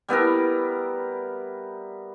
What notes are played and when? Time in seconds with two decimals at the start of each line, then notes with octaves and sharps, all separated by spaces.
0.08 G3 B3 E4 A#4